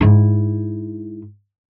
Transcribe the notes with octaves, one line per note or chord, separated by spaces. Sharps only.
G#2 E4